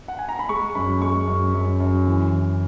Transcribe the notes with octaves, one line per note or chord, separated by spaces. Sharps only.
F#5
G#5
A#5
B5
G#3 C#6
F#2 B5
G#3 C#6
F#2
F#2
F#2
E3
E3